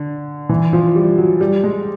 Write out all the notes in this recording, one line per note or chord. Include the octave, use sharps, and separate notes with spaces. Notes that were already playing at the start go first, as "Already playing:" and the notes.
Already playing: D3
E3
F3
G3
F#3
G3
G#3